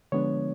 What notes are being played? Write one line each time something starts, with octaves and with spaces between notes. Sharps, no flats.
D3 F3 G#3 B3 D4 C#5